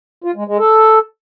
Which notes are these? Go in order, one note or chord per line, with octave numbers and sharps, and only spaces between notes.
F4
G#3
G#3
A4